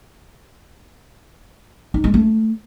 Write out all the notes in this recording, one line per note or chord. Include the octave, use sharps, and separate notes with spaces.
D#4
G#3
A3